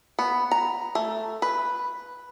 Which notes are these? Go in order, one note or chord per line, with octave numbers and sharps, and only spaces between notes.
B3
A#5
A3
B4